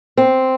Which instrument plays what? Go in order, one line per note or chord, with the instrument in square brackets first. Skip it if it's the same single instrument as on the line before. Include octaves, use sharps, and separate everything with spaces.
[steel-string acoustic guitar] C4